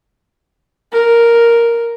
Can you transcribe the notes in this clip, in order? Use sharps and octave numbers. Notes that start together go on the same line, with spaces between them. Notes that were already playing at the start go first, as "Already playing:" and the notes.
A#4